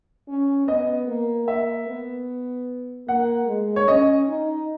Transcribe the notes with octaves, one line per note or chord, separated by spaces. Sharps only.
C#4
B3 D#5
A#3
A#3 E5
B3
A#3 F#5
G#3
C#5
C#4 D#5
D#4